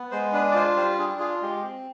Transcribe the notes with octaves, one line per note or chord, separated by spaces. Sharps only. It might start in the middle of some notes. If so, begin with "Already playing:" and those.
Already playing: B3
G#3 C5
D4 B4
D5
F4 C5
G3 C5
D4 G#4
F4 G#4
G#3 G4
C4